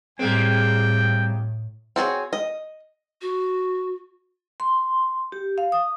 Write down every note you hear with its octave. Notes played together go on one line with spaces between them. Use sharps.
A2 G3 G#3 A#3 C4 G5
C4 F#4 G#4 C#5
D#5
F#4
C6
G4
F5
D#6